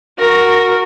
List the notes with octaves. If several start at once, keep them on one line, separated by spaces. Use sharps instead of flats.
F#4 A#4